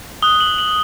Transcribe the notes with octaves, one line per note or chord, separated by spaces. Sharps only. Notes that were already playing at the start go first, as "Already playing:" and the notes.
D#6 F#6 G7
F#7
F#7